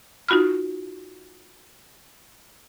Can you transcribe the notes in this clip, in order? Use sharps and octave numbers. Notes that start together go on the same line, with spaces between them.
D#4 F4 F#4 B5 F6